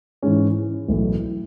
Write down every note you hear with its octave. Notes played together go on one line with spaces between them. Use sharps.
G#2 E3 G#3 C#4
B1 A2 E3 A3 E4